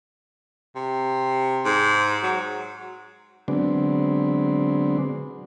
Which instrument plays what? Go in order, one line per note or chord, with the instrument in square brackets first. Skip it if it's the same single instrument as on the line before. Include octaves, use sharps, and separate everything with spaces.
[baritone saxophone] C3
G#2
F#3
[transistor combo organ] D3 F#3 G#3 B3 C4 D4